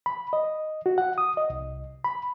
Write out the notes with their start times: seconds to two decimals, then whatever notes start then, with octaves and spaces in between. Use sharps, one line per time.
0.06 B5
0.33 D#5
0.86 F#4
0.98 F#5
1.18 D#6
1.37 D#5
1.50 C2
2.05 B5